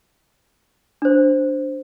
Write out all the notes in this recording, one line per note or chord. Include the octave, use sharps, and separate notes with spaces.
D4 C5